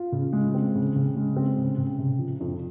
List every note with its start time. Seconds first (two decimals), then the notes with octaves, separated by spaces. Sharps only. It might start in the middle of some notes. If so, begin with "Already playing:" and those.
Already playing: F4
0.12 C#3
0.33 G#3
0.54 C4
0.75 C#3
0.95 C#3
1.16 G#3
1.36 C4
1.57 C#3
1.78 C#3
1.98 C3
2.19 F3
2.40 F2